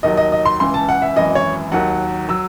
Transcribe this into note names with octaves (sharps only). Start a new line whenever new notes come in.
D#2 D#3 F#3 D#5
D#5
D#5
C6
C#2 C#3 E3 C6
A5
F#5
E5
G#1 F#2 E3 D#5
C#5
D#2 D#3 F#3 F#5
F#3 E6